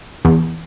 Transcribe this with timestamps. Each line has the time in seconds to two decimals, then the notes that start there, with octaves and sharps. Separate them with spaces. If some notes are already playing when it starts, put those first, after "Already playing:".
0.25 E2